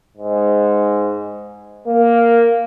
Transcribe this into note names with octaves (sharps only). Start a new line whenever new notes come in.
G#2
A#3